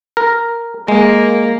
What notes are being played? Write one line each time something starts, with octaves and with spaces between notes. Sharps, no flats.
A#4
G#3 A#3